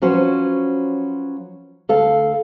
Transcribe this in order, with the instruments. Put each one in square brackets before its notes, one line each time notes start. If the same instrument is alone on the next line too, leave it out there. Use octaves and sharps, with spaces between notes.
[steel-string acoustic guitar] F3 F#3 C#4 F#4 B4 C5
D2 A4 F5